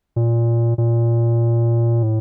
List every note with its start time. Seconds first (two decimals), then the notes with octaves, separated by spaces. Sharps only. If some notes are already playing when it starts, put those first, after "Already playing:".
0.16 A#2
0.78 A#2
2.03 A2